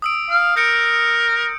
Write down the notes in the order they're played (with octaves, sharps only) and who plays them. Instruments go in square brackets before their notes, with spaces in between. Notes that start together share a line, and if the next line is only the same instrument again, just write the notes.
[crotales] D#6 E6 D7
[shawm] F5
[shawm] A#4 [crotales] G6 C#7 D7